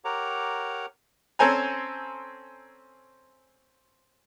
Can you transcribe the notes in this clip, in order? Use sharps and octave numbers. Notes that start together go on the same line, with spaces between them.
G4 A#4 C#5 F#5 A#5 D6
C4 C#4 A4 C5 G#5 A#5